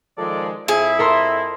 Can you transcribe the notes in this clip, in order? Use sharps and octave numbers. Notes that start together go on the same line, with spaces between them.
D#3 F3 G#3 A4 D5
F2 E4 G#4 E5
A4 A#4 C6